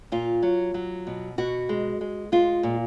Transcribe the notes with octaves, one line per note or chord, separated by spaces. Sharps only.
A#2 F4
F#3
F#3
B2
B2 F#4
G#3
G#3
G#3 F4
A#2